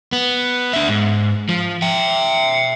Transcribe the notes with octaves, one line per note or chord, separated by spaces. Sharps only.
B3
D4 E5
G#2
F3
E5 G5